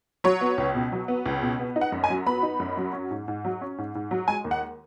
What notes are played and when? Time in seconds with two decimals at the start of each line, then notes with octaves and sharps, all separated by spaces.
0.24 F#3 C#5
0.41 B3
0.58 C#2
0.75 B2
0.92 F#3
1.08 B3
1.26 C#2
1.42 B2
1.59 B3
1.76 D#4
1.81 F#5
1.92 F#2
2.04 G#5
2.10 F#3
2.27 B3 B5
2.43 D#4
2.60 F#2
2.77 F#3
2.93 C#4
3.11 G#2
3.28 G#2
3.45 F#3
3.61 C#4
3.78 G#2
3.95 G#2
4.11 F#3
4.28 G#3 G#5
4.44 D#2
4.51 F#5